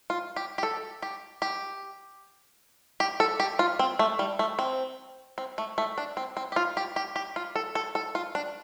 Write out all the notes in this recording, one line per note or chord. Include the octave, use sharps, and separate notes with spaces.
F4
G4
G4
A4
G4
G4
G4
A4
G4
F4
C4
A3
G3
A3
C4
C4
A3
A3
D4
C4
C4
G4
F4
G4
G4
G4
F4
A4
A4
A4
F4
D4